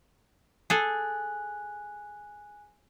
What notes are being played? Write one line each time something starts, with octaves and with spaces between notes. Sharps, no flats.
G#4 A4 G#5 F#6